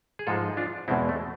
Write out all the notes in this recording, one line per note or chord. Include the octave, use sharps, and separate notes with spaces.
G#4
G#2 F3 G#3 F4 A4
D4 F4
E2 B2 G#3 C4 E4
A3